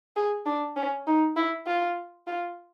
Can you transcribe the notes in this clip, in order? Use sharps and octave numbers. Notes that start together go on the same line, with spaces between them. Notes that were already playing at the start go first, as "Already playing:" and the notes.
G#4
D4
C#4
D#4
E4
F4
F4